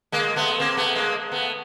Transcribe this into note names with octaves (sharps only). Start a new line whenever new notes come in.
G#3 A#3
A3 B3
A#3 C4
A3 B3
G#3 A#3
A3 B3